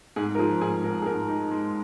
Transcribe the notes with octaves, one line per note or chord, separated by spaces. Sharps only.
G#2 G#4
A#4
F3 G#4
G#2 G#4
G#2 A#4
G#4
G#2 A#4
D#4
G#3